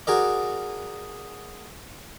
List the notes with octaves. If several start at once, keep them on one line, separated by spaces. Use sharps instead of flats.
F#4 G#4 A#4 D5